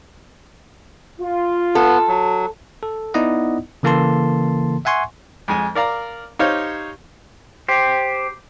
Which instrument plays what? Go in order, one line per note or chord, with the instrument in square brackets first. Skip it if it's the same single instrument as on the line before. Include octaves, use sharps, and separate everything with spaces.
[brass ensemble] F4
[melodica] B3 [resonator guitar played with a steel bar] A4
[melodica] F#3
[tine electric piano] A4
B3 D#4 E4 D5 D#5 F#5
C#3 E3 A#3 A4 A5 C6
E5 F#5 G#5 C6 C#6
[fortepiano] F2 G#3 G#5
A#4 D5 F5 A#5
D#4 G4 C5 C#5 F5
[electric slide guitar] G4 C5